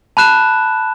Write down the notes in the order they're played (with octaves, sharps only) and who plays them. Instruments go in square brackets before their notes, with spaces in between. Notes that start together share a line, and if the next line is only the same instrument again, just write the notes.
[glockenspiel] A5 B5 F#6 E7